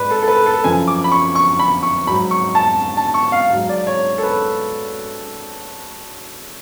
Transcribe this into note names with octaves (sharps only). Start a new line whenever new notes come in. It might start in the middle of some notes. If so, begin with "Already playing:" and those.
Already playing: G#2 B4 D5
A4
A4
B4
A4
F#2 F3 G#5
D6
B5
C#6
C#6
B5
C#6
G#2 F#3 B5
C#6
A5
A5
C#6
F5
G#2 F#3 F5
D5
C#5
A4
B4